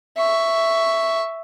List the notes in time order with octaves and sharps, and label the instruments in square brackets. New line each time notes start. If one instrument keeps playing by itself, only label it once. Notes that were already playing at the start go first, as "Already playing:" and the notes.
[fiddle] E5 C#6